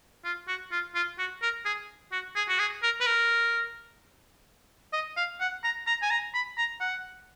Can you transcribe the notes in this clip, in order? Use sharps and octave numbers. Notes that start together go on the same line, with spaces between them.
F4
F#4
F4
F4
F#4
A#4
G#4
F#4
G#4
F#4
G#4
A#4
B4
A#4
D#5
F5
F#5
A#5
A#5
G#5
A#5
B5
A#5
F#5